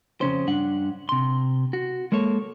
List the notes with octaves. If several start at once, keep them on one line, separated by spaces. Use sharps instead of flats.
F2 C#3 C#4 C5
G2 D4 F#5
C3 C6
F#4
G#3 A#3 A4 C#5